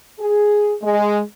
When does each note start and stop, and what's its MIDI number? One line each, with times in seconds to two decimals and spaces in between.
0.20 0.74 68
0.83 1.20 56